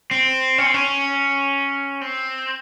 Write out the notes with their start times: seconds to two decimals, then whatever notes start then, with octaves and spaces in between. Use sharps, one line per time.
0.11 C4
0.58 C#4
0.66 C4
0.74 C#4
2.01 C4